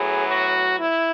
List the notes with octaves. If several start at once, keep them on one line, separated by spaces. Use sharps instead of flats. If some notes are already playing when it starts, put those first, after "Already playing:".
Already playing: A2 F#3 B3 G#4
F#4
E4